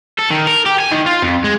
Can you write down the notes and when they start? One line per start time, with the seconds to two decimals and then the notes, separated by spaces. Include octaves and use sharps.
0.18 A4
0.30 D#3
0.47 A#4
0.66 G4
0.80 G#5
0.92 D#3
1.06 F4
1.22 F2
1.44 G#3